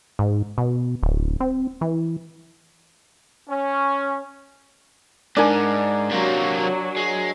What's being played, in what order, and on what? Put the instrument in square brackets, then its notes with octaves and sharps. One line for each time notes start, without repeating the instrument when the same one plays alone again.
[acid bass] G#2
B2
D1
C4
E3
[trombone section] C#4
[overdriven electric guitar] G#2 [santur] D4 A#4 G#5
[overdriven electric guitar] C3 A#3 [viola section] F#3
[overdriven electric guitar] G#3